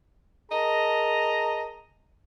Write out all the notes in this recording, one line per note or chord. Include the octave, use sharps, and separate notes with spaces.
G#4 A#4 D#5 A5 A#5